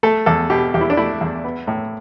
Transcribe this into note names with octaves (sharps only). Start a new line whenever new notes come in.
A3 A4
E2 A4
B2 G4
E2 G4
E4
D4
A3 E4
E2
B3
A2